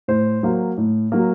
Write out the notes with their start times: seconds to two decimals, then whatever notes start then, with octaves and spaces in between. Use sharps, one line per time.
0.08 A2 C5
0.43 F#3 A#3
0.78 A2
1.12 F#3 A#3